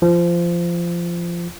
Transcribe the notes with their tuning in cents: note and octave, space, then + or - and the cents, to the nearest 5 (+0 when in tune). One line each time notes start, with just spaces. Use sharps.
F3 -20